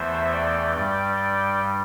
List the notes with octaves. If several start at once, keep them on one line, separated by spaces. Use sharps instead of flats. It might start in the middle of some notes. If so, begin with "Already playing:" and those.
Already playing: E2 E3 A3 C5 E5
D5 G5
G2 G3 D5 G5
D5 G5